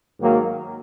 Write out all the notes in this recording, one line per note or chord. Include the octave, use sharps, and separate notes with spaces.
G#2 D#3 F#3 A#3